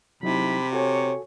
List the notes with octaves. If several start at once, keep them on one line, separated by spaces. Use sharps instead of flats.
C3 F#3 D#4 E4 B5
F#4 A4 C#5 G#5